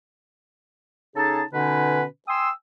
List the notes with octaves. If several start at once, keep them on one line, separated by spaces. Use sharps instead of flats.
C#3 D#4 G#4 A4 A5
B2 D3 C#4 D#4 B4
G5 G#5 C6 D#6 E6